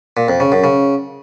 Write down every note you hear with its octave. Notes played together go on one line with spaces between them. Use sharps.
A#2
F2
C#3
F#2
C#3